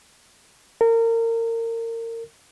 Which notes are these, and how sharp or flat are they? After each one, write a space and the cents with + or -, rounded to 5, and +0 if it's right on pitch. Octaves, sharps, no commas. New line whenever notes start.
A#4 -30